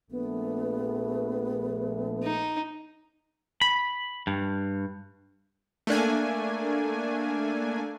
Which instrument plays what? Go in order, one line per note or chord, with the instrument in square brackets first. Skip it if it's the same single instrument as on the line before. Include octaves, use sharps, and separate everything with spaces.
[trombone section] A#1 A3 [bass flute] B3
[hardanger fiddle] D#4
[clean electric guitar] B5
G2
[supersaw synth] A3 A#3 D4 G#5